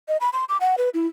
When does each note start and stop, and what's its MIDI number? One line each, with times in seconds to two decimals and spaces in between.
0.08 0.17 75
0.21 0.30 83
0.33 0.45 84
0.49 0.57 86
0.61 0.75 78
0.78 0.89 71
0.94 1.07 64